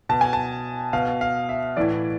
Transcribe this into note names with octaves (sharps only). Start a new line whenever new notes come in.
B2 A5
G#5
A5
B2 F5
F5
E5
A2 E3 D5